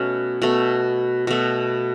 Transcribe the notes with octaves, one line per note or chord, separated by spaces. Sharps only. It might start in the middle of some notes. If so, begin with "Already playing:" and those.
Already playing: B2 A3 C#4
B2 A3
B2 A3